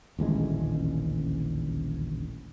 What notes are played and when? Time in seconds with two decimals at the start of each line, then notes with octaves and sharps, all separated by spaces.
0.19 D#1 A1 D2 G#3